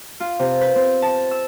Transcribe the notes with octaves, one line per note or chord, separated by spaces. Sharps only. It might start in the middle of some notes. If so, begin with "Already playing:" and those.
F4
C3
B4
C4
A5
E6